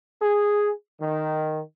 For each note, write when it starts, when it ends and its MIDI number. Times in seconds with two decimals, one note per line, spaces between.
0.22 0.71 68
1.01 1.60 51